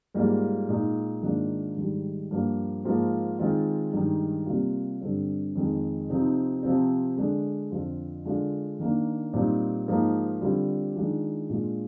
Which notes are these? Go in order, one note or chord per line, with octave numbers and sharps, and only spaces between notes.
G#2 G3 A#3 F4
A#2 G#3 D#4
G#2 D#3 A#3 D4 F4
G#2 D#3 G3
G2 F3 A#3
G#2 F3 A#3 F4
D#3 G#3 C4 F4
G2 D#3 G#3 D#4
C3 G3 A#3 F4
G2 D3 G3 C4
F2 D#3 G#3
C3 F3 C4 D#4
C3 F3 C4
D3 G#3 D4
F2 D3 F3 C4 F4
D3 G#3 D4 F4
D#3 A#3 D4
A#2 G3 C4 D#4
G#2 F3 A#3 D#4
D3 G3 C4 F4
D#3 G#3 D4 F4
A#2 G#3 D4 F4